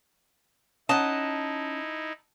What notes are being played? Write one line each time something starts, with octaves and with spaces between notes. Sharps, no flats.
C#4 D#4 E4 D#5 F#5 A5 A#5